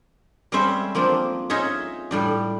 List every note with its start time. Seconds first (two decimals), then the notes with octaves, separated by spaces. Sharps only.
0.52 G3 G#3 C4 C#4 C5 E5
0.95 F3 A#3 C4 D4
1.50 C#4 D#4 F4 G#4 C#5 E5
2.11 A2 G3 D4